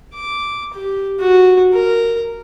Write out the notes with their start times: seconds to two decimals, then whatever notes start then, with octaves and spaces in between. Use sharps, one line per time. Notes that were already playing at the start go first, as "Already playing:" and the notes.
0.14 D6
0.73 G4
1.19 F#4
1.73 A#4